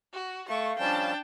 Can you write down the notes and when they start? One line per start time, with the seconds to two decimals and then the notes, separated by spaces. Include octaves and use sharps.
0.13 F#4
0.49 A3 F5 C#6
0.79 F3 G3 C#4 D4 G5 A5